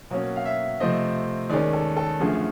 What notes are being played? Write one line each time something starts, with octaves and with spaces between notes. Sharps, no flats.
B2 F#3 A#3 C#4
F5
E5
C3 F3 A3 C4 D#5
D#2 D#3 G#3 C#4 D5
A4
A4
F#2 D3 F3 A3 G#4